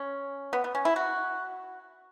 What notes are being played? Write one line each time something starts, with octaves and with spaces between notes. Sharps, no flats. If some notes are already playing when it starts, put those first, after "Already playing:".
Already playing: C#4
B3
B3
C#4
E4
F#4